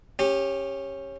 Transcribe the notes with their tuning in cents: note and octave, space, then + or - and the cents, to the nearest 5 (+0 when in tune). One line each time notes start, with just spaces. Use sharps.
C#4 -15 G4 +15